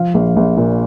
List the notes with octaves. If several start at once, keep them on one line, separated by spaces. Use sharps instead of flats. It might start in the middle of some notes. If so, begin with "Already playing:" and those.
Already playing: F3 F5
A#1
A#1
A#2